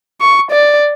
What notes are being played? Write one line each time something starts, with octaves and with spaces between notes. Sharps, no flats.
C#6
D5